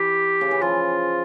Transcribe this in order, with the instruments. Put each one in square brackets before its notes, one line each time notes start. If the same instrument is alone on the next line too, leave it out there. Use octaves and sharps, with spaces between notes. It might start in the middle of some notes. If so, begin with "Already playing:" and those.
Already playing: [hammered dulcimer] E3 [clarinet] G4
[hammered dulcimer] C#3
E3
[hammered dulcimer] F3 [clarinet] F4